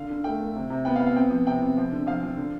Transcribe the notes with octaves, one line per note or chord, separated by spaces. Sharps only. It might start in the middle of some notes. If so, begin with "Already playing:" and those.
Already playing: D3 F5
D3
A3 G5
A3
C3
C3
B3 G5
F5
B3
F5
C4 G5
F3
C3 G5
C3
F3
D3
F3 F5
F3
D3